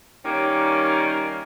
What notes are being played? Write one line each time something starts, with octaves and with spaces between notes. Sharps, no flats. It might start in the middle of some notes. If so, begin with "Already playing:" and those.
D#3 G3 A#3 C#4